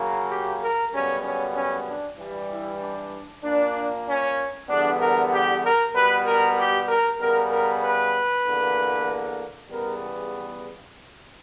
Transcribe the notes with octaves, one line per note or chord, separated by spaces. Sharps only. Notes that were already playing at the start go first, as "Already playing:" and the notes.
Already playing: C#3 F#3 A#3
G4
A#4
F#2 C#3 G3 B3 C#4
C#4
C#4
D4
G2 E3 G3
E4
D4
A#2 A#3 D4
C#4
E2 D3 G3 B3 D4
A#4
G4
A#4
B2 G3 B3 B4
A#4
G4
A#4
C#3 G3 B3 A#4
A#4
B4
E2 D3 A#3
E2 C#3 G3 B3 A#4